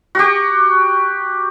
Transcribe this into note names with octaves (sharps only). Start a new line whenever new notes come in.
F#4 G4